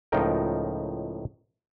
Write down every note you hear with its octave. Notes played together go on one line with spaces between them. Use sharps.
C#2 A2 F3 D#4 A#4 G5